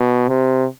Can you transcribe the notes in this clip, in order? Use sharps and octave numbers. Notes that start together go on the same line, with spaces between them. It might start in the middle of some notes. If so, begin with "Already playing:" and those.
Already playing: B2
C3